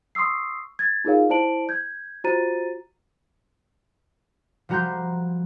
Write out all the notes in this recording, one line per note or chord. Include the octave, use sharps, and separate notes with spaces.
C6 C#6 D#6 E6 C7
G#6 A6
D#4 F4 G#4 A#4 C#5 F5
E4 C5 D5 A5 D7 F#7
G6 G#6
F4 F#4 C5 A#5 A6 D#7
F3 G3 F#4 A#5 C6 G6